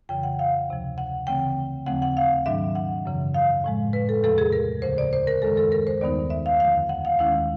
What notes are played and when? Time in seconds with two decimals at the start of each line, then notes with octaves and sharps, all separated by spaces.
0.09 F2 C#3 E3 G5
0.23 F#5
0.39 F5
0.69 D2 C3 F3
0.98 F#5
1.27 C#3 E3 A3 C4 G5
1.86 D#2 C#3 F3 A3 C4 F#5
2.02 F#5
2.17 F5
2.46 G#2 D#3 F#3 A3 D4 E5
2.75 F#5
3.05 F#2 C#3 E3
3.34 F5
3.64 A2 F3 G#3
3.93 B4
4.09 A4
4.23 E2 C3 F3 A3 A4
4.38 G#4
4.52 A#4
4.82 D2 C#3 F3 C5
4.98 D5
5.13 C5
5.27 A#4
5.42 F#2 D#3 G#3 A4
5.57 A4
5.72 A#4
5.87 C5
6.01 D#2 D#3 G3 B3 D#4 D5
6.30 E5
6.46 F5
6.60 F2 D3 F3 A3 F5
6.89 F#5
7.05 F5
7.19 D#2 D#3 G#3 C#4 E4 F5